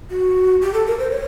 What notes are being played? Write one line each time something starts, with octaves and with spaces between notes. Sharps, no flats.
F#4
G4
A4
A#4
C5
C#5